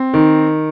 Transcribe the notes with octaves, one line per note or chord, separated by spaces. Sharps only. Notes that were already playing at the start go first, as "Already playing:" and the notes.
Already playing: C4
D#3